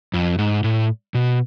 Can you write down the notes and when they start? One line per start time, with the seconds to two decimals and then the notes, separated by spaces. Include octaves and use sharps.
0.14 F2
0.39 G#2
0.64 A2
1.15 B2